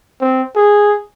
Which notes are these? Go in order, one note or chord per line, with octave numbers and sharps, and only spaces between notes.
C4
G#4